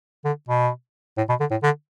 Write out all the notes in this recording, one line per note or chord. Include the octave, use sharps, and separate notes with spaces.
D3
B2
A2
B2
D3
A2
D3